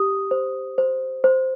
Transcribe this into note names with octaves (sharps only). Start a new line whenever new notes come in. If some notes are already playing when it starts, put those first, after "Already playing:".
Already playing: G4 D#6
C5
C5
C5